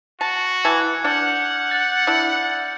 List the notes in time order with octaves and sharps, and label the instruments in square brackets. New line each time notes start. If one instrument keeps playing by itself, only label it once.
[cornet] F#4 [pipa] A5
[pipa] E3 A5 [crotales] F#6 G#6
[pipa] D4 [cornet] F#5 [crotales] D6 F6 G6
[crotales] F#6 A6
[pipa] D4 E4